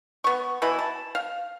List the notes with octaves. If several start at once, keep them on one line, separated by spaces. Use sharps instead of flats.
B3 C#6
B2 E3 E4 B5
A5
F5